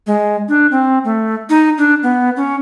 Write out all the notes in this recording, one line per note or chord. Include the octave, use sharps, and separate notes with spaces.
G#3
D4
C4
A3
D#4
D4
B3
C#4